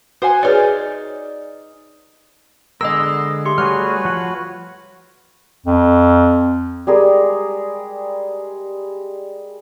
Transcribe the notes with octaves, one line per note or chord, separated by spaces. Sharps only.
F#4 C5 F#5 G#5
D#4 G#4 B4 C#5 D5 F6
D3 G#3 B3 A#4 D#5 C6 E6
A3 G4 C6
G3 A3 F#4 G#4 B4 C#5 F6
F3 F#5
F2
G3 G#3 G#4 A#4